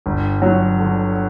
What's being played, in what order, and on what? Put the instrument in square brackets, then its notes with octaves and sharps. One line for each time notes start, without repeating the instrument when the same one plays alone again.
[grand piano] G1
F#3
D3